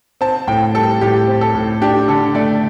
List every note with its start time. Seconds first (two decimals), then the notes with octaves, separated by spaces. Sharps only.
0.21 C4 A5
0.47 A2 G5
0.74 G3 A4
1.01 A2 G4
1.28 C4
1.41 A4
1.55 A2
1.81 D4 G4
2.08 D3 A4
2.35 A3 D5